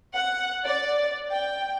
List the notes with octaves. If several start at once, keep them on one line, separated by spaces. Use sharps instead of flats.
F#5
D5
G5